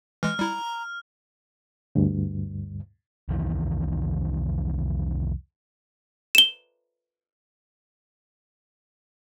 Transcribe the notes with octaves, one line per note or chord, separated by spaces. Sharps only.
E3 G#3 F6
G3 E4 A#5
D2 G2
C2 F2 D#3 E3
E7 G7